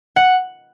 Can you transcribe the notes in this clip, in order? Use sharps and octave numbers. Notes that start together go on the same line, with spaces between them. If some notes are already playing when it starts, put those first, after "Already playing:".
F#5